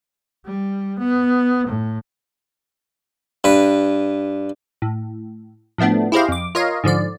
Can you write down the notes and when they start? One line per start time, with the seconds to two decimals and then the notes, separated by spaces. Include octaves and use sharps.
0.45 G3
0.99 B3
1.67 A2
3.44 G2 B4
4.82 A2
5.78 A2 F3 A3 B3 D4
6.12 E4 G4 G#4 C5 D#5 F5
6.28 F2 D6
6.55 F4 A#4 C#5 D#5 F5
6.84 G#2 D3 F3 D5